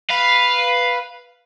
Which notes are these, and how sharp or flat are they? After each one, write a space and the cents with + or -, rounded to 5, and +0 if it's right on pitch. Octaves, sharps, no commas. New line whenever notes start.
B4 +0 F5 +0